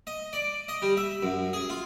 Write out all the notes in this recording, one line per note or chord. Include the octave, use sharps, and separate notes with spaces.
D#5
D5
D#5
G3
E5
F#2
G#4
F4